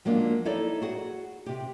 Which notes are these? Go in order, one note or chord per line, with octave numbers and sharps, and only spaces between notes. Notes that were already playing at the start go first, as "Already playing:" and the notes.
F3 F#3 G#3 A#3 B3 D4
D#4 E4 A4 C#5 D5
F#4 G#4 F#5
C3 G4